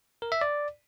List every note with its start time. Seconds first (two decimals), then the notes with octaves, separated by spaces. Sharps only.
0.22 A#4
0.32 E5
0.41 D5